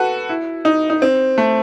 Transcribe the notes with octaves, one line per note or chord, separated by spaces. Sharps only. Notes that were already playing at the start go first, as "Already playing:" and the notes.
Already playing: F#4 A4 B4
E4
D#4
D#4
C4
A3